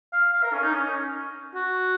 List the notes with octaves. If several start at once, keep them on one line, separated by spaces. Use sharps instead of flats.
F5
F5
A#4
C#4
D#4
C#4
F#4